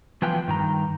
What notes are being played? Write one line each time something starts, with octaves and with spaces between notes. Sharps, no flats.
E3 F3 B3 F4 G5
G2 D#3 A#5